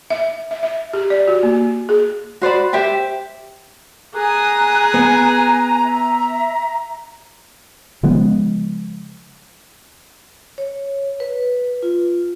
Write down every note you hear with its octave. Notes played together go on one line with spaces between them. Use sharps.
E5
E5
E5
G4
D5
F#4
A#3
G#4
F#4 C5 D5 B5
G4 C5 E5 G5
G#4 G#5 A#5 D#6 F#6
B3
E5
C#3 F3 G#3 B3
C#5
B4
F4